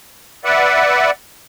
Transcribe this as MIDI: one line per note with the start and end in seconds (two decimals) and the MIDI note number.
0.45 1.11 71
0.45 1.11 74
0.45 1.11 76
0.45 1.11 78